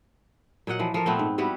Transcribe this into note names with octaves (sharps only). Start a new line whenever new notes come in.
A#2 F#3 D#5 F#5
E3 F3
F3 A4 A#4
A#2 A3 B3 C4
G#2
G3 B3 E4 F#4